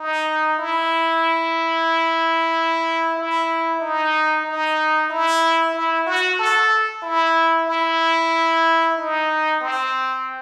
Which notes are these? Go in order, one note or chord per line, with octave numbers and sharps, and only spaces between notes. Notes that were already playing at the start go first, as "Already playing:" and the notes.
Already playing: D#4
E4
E4
D#4
D#4
E4
E4
F#4
A4
E4
E4
D#4
C4